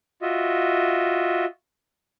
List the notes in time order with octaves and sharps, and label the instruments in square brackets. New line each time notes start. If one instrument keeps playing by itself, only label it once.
[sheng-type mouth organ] F4 F#4 D#5 E5